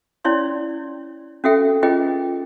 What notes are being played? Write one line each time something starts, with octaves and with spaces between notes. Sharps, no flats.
C#4 E4 C#5 D5 C6
C#4 F#4 A4 E5 G5
C#4 F4 G#4 B4 D#5 G5